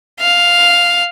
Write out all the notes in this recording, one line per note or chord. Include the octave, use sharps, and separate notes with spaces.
F5